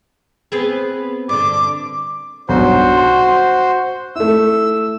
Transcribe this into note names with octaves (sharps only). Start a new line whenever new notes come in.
B3 C4 G#4
G2 D3 D6
B1 G2 F#4 C5
C6
A3 E4 E6